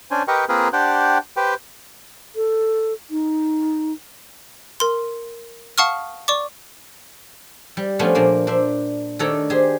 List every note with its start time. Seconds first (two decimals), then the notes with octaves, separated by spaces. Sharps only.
0.11 C#4 D4 C5 G#5
0.28 G4 A#4 B4 D#5 G5 C#6
0.49 A#3 C4 F4 G#4 A#4 B4
0.73 D4 G4 C5 F#5 G5
1.37 G4 B4 C5 G5
2.36 A4
3.10 D#4
4.80 A#4 C6
5.78 F5 F#5 A5 C#6 D#6 F6
6.28 D5 C#6 D6
7.77 G3
7.99 F3 A3 B3 C#4 D4 F4
8.15 A#2 F3 A#3 D4
8.47 D4 C5 E5
9.19 D#3 A3 D4 A4 C#5 A#5
9.50 G4 G#4 C5